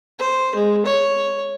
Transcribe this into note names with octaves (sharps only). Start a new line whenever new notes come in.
C5
G#3
C#5